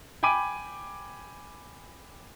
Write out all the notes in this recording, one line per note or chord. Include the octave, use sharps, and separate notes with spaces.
G5 G#5 B5 D6 D#7